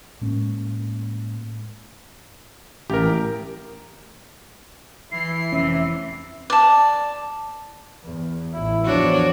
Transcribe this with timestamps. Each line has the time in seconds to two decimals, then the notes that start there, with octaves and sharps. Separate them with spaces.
0.21 A2 G#3 A#3 C#4
2.90 A1 G4 A#4
5.12 E3 E4 C7
5.52 F1 C3 E3 C#4 E5
6.50 D5 A5
8.04 E2
8.53 A1 E4
8.84 E2 F3 D4 F#4 C#5